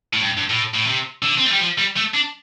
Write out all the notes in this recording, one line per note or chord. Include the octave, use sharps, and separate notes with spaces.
A2
G2
G2
A2
A2
C3
D3
C4
A3
G3
F3
G3
A3
D4